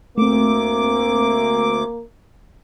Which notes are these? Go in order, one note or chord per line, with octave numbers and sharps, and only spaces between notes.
D2 A3 A#3 C4 D6